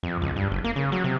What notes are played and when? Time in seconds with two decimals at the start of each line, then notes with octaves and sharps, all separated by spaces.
0.03 F2
0.22 C#2
0.36 G2
0.51 F#1
0.64 A#3
0.76 C#3
0.92 F#3
1.04 C3